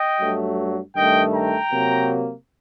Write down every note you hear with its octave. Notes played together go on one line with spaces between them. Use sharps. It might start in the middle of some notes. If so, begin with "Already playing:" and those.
Already playing: D#5 G5
G2 F#3 A3
G2 D#3 A3 D#5 G5
G5 A#5
C3 F#3 A#3